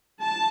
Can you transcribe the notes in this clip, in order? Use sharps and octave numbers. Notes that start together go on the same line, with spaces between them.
A5